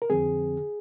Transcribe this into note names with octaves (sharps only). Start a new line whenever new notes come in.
A#4
F2 D3 F3 C4 G#4